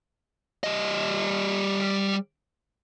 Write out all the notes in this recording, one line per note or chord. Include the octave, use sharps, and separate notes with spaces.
G3 D#5